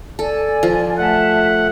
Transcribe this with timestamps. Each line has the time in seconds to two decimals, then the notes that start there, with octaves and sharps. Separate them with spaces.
0.19 A4 D5 G#5
0.63 F3
0.98 A3 E5 F#5 A5